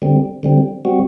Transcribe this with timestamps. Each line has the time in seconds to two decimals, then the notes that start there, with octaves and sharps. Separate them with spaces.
0.02 D3 G3 C4
0.43 D3 G3 C4
0.85 G3 C4 F#4